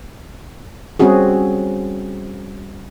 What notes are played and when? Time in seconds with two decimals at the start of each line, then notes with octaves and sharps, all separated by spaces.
0.99 G3 C4 C#4 F#4 G#4